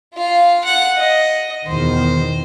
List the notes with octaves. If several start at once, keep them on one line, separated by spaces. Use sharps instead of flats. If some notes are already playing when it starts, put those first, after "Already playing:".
F4 F5
F#5
D#5
E2 B2 D#3 C5